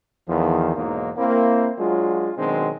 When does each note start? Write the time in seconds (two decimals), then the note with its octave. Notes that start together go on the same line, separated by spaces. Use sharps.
0.28 E2 D#3 F3
0.76 B1 E2 G#2 F#3 A#3 D#4
1.17 A#3 C4 E4
1.79 F#3 G#3 D4 F4
2.38 B2 D#3 F#3 G#3 C4 D4